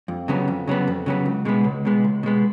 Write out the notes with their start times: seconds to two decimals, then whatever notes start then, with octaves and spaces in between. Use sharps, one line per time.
0.08 F2
0.28 C#3 F#3 B3
0.48 F2
0.68 C#3 F#3 B3
0.87 F2
1.06 C#3 F#3 B3
1.26 C#2
1.45 B2 G#3 B3
1.64 C#2
1.85 B2 G#3 B3
2.04 C#2
2.23 B2 G#3 B3